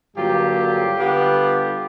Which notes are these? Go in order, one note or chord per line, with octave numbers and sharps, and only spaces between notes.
G2 D3 F#3 A#3 F4 G4
D3 G3 B3